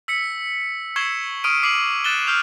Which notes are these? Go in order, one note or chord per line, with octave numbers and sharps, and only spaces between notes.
E6 B6 C#7
C#6 E6 G#6 C7 E7 G7
C#6 D#6 F6 D7 D#7
D6 C7 D7 D#7 F#7
F#6 A6 E7 G7
C#6 F6 G6 C7 F7 G7